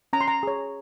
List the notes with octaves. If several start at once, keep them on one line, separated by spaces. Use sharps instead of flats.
C#4 A#5
C6
A#5
G#4 C#5